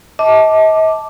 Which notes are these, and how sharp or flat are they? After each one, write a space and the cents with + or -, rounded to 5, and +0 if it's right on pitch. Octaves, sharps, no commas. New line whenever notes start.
D#5 +40 A5 -5 D6 +0